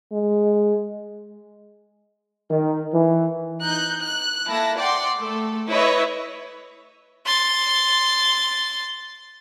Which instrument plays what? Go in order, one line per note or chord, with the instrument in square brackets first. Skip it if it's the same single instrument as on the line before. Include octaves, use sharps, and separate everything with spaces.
[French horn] G#3
[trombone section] D#3
E3
[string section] D#4 F#6 G6
F#6
A#3 E4 A4 A5 A#6
D5 F#5 G5 C6
A3 A4
E4 B4 C#5 D#5 E5
[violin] C6 A6